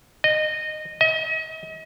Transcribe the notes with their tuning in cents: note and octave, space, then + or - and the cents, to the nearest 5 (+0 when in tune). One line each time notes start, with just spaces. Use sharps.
D#5 -15
D#5 +40